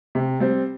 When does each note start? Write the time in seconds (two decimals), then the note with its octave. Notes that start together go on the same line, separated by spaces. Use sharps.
0.15 C3
0.40 G3 C4